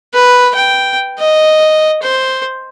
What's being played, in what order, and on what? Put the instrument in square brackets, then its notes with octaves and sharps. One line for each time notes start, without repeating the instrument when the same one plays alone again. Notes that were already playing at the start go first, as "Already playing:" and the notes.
[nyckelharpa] B4
G5
D#5
C5